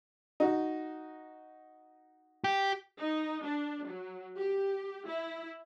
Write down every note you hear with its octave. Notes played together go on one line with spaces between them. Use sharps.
D#4 F#4
G4
D#4
D4
F#3
G4
E4